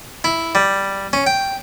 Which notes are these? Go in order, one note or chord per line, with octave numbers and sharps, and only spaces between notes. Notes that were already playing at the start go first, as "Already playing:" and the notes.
E4
G3
C#4
G5